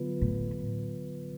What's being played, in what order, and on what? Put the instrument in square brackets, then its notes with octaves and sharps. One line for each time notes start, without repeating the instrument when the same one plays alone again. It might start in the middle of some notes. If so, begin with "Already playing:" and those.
Already playing: [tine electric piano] D3 F#3 B3 F4 B4
[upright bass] A2